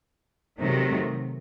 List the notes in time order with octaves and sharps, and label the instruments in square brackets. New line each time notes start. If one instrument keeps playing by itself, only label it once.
[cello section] C3 D#3 F#3 A3